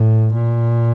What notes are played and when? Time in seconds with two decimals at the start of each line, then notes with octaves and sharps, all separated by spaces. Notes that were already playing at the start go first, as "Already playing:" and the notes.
Already playing: A2
0.34 A#2